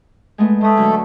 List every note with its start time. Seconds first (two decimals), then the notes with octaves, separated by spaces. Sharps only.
0.38 G#3 A3 B3
0.61 G#3 A3 D#6
0.77 D3 F#3